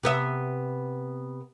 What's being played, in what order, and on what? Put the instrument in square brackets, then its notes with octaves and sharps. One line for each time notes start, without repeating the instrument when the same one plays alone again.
[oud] C3 B3 E5